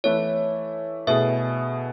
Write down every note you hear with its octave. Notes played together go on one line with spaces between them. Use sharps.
E3 A3 E4 C#5
B2 A3 E4 G#4 E5